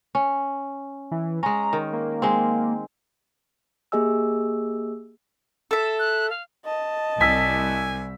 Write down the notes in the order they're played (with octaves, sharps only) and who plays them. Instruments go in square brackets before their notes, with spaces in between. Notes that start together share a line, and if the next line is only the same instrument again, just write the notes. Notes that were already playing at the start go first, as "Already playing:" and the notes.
[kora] C#4
[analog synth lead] E3
[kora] G#3 C#4 [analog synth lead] A#5
[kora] D#3
[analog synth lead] A#3
[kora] G#3 C4
[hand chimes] A#3 G4 G#4 D#5 G#5 E6
[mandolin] A4 E5
[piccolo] F#6
F5
[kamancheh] D#5 A5
[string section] C2 [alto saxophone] G#5 [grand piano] E6 B6